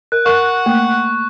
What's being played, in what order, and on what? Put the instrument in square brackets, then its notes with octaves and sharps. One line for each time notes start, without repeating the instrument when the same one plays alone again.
[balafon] A#4 [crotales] F#6
[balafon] A#4 [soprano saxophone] F#5 [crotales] C#6
[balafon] A3 A#3